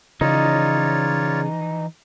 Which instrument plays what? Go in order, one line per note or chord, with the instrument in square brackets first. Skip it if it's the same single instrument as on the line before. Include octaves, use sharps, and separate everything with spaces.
[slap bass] C#3 [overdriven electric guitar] E3 F3 [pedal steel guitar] D#4 [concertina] F4 C#5 D5